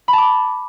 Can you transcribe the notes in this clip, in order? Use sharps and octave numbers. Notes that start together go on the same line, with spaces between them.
B5
A5
D6